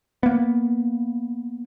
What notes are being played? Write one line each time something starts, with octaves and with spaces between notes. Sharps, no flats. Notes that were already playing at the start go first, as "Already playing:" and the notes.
A#3 B3